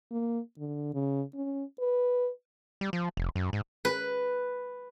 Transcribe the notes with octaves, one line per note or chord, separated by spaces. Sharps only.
A#3
D3
C#3
C#4
B4
G3
F3
F1
F#2
G#2
B4